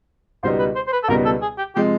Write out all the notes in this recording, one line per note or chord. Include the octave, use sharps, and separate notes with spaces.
C#2 B2 G3 B3 D#4 C5
B4
C5
C5
B4
A4
C#2 B2 G3 B3 D#4 A#4
A4
G#4
G4
C3 F3 G#3 G4